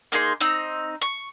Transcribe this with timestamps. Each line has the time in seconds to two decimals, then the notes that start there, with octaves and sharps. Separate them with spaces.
0.12 A#3 D#4 G#4 C6
0.41 C4 D#4
1.01 C#6